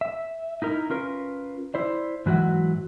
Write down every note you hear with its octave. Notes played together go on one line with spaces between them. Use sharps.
E5
D#4 E4 A#4
C#4 F4 A#4 B4
E4 C5 D5
G#2 E3 F#3 F#4 E5 F#5